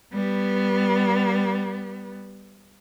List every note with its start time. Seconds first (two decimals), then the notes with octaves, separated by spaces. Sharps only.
0.14 G3 B3